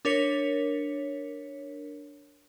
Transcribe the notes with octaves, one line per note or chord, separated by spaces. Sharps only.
D4 A#4 C#5 B6 C#7